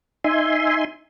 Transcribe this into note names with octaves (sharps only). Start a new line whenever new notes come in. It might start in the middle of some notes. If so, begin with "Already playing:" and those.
D#4 E5 G#5 C6